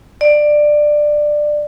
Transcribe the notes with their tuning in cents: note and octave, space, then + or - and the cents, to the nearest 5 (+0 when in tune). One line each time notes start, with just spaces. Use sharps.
D5 +15